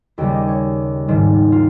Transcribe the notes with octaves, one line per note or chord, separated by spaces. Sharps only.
D#2 C#3 G3 G4
D#5
C#5
G#2 D#3 G3
F4